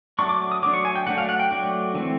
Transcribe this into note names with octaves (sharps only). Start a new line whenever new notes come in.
F#3 A3 D4 C#6
D6
D#6
F#3 A3 D4 D6
C#6
G#5
G5
F#3 A3 D4 F#5
F5
F#5
G5
F#3 A3 D4
E3 A3 C4